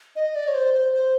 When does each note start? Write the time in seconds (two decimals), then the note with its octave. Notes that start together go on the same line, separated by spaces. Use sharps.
0.16 D#5
0.35 D5
0.48 C#5
0.55 C5
0.74 C5
0.94 C5